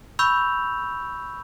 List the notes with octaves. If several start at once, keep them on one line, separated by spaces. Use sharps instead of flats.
B5 C#6 E6 G6 F7